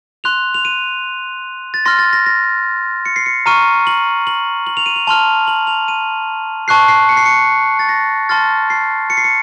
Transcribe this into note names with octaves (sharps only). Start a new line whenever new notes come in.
C6 F#6 F7
F7
D#7
A6
C6 F6 A#6
A6
A#6
A#6
C#7
C7
C#7
A#5 C#6 F6 D#7
F#7
F#7
F#7
F7
D#7
F7
A5 C6 F6 F7
F#7
F7
D#7
A5 C#6 F#6 C7
C7
C#7
C7
C#7
A6
A#6
A5 C6 F6 A6
C7
C#7
C7
C#7